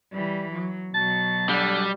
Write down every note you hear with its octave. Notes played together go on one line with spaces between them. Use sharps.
E3 G3
F#3
B2 F#3 A5
D3 G3